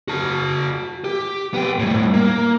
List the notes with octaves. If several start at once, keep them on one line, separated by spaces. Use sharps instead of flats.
F#4 A5
G4
B3 G5
A2 G3
A#3